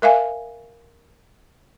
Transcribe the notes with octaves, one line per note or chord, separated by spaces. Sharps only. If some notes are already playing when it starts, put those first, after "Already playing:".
A#4 E5 F5 G#5